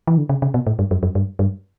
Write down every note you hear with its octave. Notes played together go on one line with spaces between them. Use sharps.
E3
D3
C#3
C#3
B2
A2
G2
F#2
F#2
G2
G2